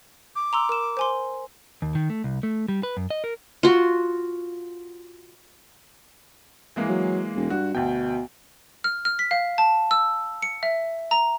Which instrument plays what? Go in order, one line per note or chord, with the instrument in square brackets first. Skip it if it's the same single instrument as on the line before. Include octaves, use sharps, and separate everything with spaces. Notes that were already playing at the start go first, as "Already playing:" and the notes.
[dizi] D6
[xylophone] A#5 C6 E6
A#4 E7
C5 G#5 C6
[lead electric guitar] D#2
D#3
A3
C2
A3
G3
B4
F#2
D#5
A#4
[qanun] F4 F#4
[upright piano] E3 G#3 A#3
[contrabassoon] F#3
E1
[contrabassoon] G2 [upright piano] F#4
[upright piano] D2 G5 [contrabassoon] B2
[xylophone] F6
F6
B6
F5
A5
E6
C#7
E5
A#5